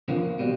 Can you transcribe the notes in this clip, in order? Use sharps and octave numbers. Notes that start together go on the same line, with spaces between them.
F2 D3 F3 A#3
B2 G3